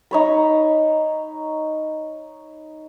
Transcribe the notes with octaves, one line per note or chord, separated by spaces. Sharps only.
D#4 C#5 B5